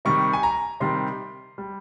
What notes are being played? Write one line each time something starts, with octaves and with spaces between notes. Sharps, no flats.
C3 D#3 G3 C#6
G#5
A#5
C3 D#3 G3 C6
G3